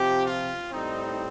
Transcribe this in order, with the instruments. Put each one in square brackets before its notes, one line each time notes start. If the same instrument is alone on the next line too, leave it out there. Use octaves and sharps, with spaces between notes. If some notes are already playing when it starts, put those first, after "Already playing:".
Already playing: [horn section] C3 F3 C4 G4
F4
A2 G3 C4 D#4